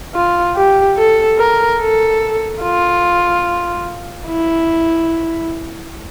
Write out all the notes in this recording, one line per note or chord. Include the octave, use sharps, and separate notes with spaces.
F4
G4
A4
A#4
A4
F4
E4